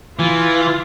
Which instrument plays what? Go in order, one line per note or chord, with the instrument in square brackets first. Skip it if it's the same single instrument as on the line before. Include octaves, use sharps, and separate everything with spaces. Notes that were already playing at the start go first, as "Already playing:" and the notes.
[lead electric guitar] E3 [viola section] F4